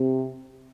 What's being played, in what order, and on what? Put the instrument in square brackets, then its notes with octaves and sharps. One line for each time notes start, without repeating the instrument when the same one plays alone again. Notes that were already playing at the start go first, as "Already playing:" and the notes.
Already playing: [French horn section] C3